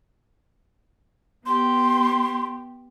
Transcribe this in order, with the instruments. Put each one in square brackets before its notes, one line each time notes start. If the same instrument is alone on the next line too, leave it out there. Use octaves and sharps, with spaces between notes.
[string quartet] B3 G4 [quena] C6